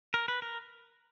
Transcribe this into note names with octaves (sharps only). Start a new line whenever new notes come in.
A#4
B4
A#4